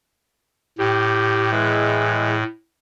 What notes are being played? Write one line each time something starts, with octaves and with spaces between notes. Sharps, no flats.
A2 G4
E3 G#3